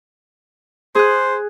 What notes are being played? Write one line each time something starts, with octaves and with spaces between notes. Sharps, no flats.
G#4 C5 F#6